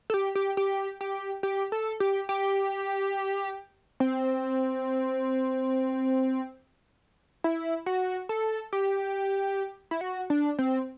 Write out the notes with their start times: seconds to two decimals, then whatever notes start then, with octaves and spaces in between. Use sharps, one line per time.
0.10 A4
0.14 G4
0.35 G4
0.57 G4
1.01 G4
1.43 G4
1.72 A4
2.00 G4
2.29 G4
4.00 C4
7.44 E4
7.86 F#4
8.29 A4
8.73 G4
9.91 E4
10.01 F#4
10.30 D4
10.59 C4